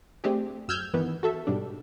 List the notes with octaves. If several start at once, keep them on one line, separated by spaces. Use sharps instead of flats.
A3 C4 D4 G4 G#4
F#2 E6 F6 G6 G#6
G2 D#3 E3 B3
F#4 A4 E5
G#2 B2 G3 D4